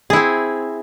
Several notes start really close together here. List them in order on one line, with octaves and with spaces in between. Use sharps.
G#4 E4 C4